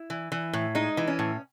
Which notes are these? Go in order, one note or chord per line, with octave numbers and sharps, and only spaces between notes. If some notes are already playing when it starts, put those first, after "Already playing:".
Already playing: E4
E3
E3
A2
G#3 D#4
E3
C#4
A2